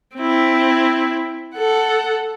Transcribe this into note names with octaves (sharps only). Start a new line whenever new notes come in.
C4 E4
A4 F#5